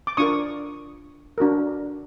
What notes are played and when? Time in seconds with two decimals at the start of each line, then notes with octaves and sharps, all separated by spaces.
0.07 D6
0.17 D4 F4 A#4 C#6 D#6
1.38 D4 F#4 A#4